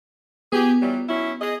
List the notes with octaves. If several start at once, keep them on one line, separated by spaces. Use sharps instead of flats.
B3 F4 G4 G#4
E3 F#3 G3
F#3 C#4 E4
G#4 D#5